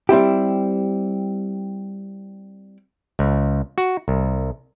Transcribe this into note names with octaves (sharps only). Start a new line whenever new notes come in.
G3 C4 E4 G4
C#2
F#4
C2